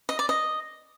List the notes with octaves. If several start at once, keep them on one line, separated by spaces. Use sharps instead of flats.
D#5
D5
D#5